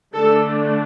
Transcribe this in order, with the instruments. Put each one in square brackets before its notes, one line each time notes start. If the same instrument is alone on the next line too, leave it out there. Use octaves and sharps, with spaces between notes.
[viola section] D3 A3 D4 A4